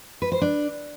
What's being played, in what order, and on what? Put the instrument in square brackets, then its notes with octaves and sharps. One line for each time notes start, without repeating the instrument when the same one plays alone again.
[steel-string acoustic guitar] B4
C5
D4